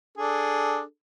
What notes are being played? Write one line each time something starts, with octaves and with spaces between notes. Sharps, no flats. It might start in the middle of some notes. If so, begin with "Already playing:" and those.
D4 G#4 A4